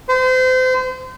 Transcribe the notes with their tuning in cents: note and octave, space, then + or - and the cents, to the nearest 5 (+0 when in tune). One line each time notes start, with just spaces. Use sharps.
C5 -35